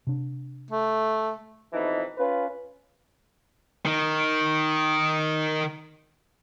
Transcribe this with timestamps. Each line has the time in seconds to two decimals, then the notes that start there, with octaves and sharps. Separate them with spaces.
0.07 C3 D4
0.71 A3
1.73 F2 B2 E3 D#4
2.18 C#4 F4 B4
3.86 D#3 D#4